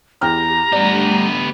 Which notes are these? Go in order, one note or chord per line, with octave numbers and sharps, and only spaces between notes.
E2 G4 G5 A#5 F6
G3 A3 B3 D4 G4 D5